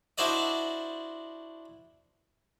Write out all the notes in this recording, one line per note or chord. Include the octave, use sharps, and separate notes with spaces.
D4 E4 F#4 C5 D5 D#5